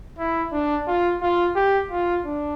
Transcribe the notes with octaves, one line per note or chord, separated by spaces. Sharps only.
E4
D4
F4
F4
G4
F4
D4